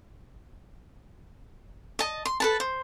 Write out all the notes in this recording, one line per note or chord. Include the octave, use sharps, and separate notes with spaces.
D#5 A5
C6
A4 B4 A5
C5